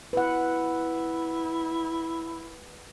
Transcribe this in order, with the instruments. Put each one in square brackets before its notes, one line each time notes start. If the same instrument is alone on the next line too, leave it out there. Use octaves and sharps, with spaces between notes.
[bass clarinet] E4 [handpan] B4 F#5